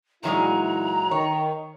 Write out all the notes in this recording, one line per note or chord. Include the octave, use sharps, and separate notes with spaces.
A#2 E3 F#3 G#3 D#4 E4 A#5
D#3 C#5